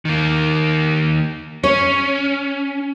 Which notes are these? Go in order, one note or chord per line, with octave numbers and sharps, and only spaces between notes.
D#3 A#3
C#4 C#5